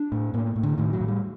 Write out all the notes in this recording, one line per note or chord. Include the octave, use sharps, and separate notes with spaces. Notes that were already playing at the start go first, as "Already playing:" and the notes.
Already playing: D4
A2
A2 A#3
A2
D3
A2 D#3
F#3
A2
G3